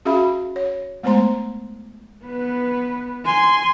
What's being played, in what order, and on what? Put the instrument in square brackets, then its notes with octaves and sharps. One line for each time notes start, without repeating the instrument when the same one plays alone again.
[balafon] C#4 F#4 G#4 E5 F5 B5
C#5
G#3 A3 B3 C5 A#5 C6
[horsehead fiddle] B3 B4
[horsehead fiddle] G#5 [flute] C6